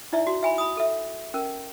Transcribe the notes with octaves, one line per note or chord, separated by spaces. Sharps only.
D#4 E4 D5 E5
F#4
E5 G#5 B5
B5 D#6
A4 E5
C#4 A#4